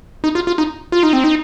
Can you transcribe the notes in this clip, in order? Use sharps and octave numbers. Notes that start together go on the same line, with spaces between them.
D#4
F4
F4
D#4
F4
D#4
C4
D#4